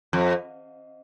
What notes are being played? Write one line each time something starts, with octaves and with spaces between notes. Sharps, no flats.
F2